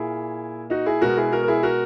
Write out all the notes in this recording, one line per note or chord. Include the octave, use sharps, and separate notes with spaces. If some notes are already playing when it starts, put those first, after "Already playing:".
Already playing: A#2 A#3 E4 G#4
D#4 F#4
E4 G#4
B2 G#3 B3 F#4 A#4
E4 G#4
F#4 A#4
A#4
E4 G#4
F#4 A#4